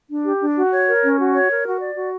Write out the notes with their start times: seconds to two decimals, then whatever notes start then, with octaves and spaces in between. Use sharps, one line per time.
0.08 D4
0.24 G4
0.40 D4
0.56 F#4
0.71 C#5
0.87 A#4
1.02 C#4
1.18 F#4
1.33 C#5
1.50 A#4
1.65 F#4
1.80 D5
1.96 F#4